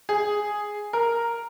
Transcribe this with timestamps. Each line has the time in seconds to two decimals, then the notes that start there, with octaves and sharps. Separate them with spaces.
0.09 G#4
0.93 A#4